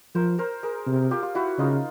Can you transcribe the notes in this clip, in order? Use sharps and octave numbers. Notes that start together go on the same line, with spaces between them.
F3 A#4 C5
A#4 C5
G#4 A#4
C3
F4 G4
F4
E4 F#4
C#3 D#4 F4